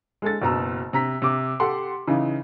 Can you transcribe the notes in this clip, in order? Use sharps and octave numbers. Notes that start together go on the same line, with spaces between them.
G#3 A4 A6
F#1 B2 A#5 E6
C3 A#5 B6
C3 D6
G4 A4 F#5 C6
C#3 E3 D#4